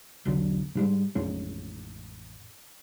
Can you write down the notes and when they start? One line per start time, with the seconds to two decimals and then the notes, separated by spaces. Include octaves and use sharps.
0.25 E1 B1 D3 F#3
0.75 G#2 G3 G#3
1.15 A1 F2 G#3 C#4